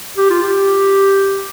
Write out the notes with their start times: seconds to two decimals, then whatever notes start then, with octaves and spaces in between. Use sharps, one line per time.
0.17 G4
0.30 F4
0.42 G4